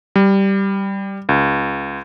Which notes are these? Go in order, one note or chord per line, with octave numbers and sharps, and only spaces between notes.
G3
C#2